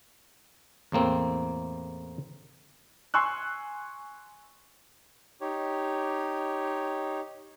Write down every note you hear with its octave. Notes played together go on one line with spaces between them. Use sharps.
E2 A2 A#3 C4
G#5 C6 C#6 E6 F#6
D#4 G4 C#5